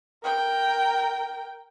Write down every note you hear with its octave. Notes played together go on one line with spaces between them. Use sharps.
A#4 G5